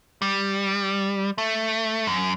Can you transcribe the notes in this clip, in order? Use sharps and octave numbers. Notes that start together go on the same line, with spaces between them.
G3
A3
F#2